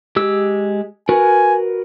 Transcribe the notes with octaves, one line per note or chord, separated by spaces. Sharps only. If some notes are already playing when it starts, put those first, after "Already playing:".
G#3 G4 E6
F#4 A#4 B4 G#5